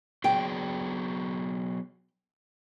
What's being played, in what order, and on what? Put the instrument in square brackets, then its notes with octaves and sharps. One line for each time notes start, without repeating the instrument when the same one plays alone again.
[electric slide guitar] F#3 B3 G#4 [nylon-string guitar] G5